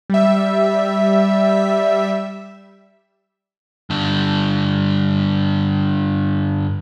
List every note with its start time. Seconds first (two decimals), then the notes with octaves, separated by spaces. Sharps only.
0.10 G3 E5
3.90 G2 D3